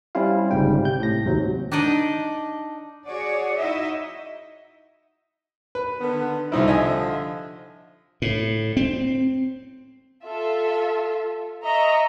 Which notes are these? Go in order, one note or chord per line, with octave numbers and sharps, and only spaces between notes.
G3 C4 C#4 E4 F4 F5
G1 G#2 C#3 G3 G5
C3 G6
A2 A#6
D#2 G#2 C3 F#3
D4 D#4 D5 D#5
F#4 G#4 C#5 D5
D#4 E4 F#4 D#5 E5
B4
D3 D#3 B3
C2 D3 F3 D#4 E4
D#5 E5 G#5
A2
C4
F4 A4 E5
D#5 E5 A#5 C#6